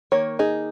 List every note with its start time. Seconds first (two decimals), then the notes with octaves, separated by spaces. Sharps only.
0.12 D#3 A#3 C#5
0.39 D#4 G#4